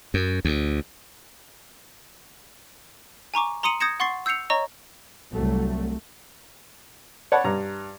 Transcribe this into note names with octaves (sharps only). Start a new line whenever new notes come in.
F#2
D2
G#5 A#5 C#6 D6
A#5 C6 D#6 C#7 D#7 F#7
D#6 G6 G#6 A#6 C#7 E7
F#5 C6 C#6 A6 C7
E6 G6 C7 C#7 F7
C#5 D#5 A#5 C#6
C2 F#3 A3
C#5 D5 F#5 A5 B5
G2 A#5